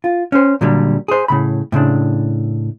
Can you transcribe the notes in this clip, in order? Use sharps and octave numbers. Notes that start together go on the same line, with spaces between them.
F4
C#4 C5
A#2 D3 F#3 G3
G#4 C5
A2 C#3 B5
A2 C#3 C4 D4